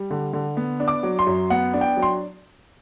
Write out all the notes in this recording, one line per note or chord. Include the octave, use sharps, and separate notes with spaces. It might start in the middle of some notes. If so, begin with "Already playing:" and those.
Already playing: G3
D3
D3
B3
D4
D6
F#3
C6
F#2
B3 F#5
D4
G5
F#3
C6